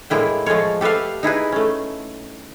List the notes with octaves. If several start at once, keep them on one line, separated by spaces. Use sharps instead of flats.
A2 G#3 A#3 E4 G5
F3 G#3 A3 F4 C#5
G4 A4 B4 E5 F5
D#4 E4 G#4 B4
A3 C#4